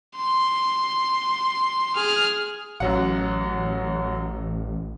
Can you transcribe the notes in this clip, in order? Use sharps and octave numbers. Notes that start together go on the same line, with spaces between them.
C6
G#4 F6
A1 F#2 F#3 F#5